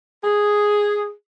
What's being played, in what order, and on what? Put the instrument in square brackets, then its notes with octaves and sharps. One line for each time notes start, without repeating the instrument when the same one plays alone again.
[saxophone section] G#4